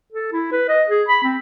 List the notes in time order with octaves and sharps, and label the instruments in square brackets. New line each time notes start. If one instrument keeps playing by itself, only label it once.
[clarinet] A4
E4
B4
D#5
G#4
B5
C4